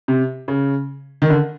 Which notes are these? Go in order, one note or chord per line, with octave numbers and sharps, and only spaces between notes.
C3
C#3
D#3
D3